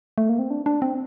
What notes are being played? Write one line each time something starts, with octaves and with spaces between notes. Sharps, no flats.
A3
A#3
C4
D4
D4
C4